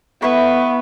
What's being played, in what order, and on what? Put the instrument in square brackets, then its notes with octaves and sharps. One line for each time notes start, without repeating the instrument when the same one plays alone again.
[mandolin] A3 E4 B4 E5 [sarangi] B3